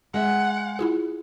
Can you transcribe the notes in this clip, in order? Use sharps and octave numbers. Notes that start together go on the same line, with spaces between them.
G#3 E5 F#5
E4 F4 G#4